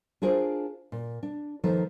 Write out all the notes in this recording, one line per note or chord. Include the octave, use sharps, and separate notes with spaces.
D4 F4 G#4 A#4 C5
A#2
D4
D#3 F3 A#3 D#4 A4 B4